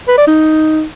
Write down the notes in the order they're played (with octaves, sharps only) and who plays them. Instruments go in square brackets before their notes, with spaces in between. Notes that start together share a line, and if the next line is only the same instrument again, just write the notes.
[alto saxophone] B4
D5
D#4